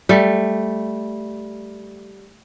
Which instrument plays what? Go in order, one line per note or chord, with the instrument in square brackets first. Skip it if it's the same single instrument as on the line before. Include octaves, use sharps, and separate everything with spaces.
[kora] G3 A3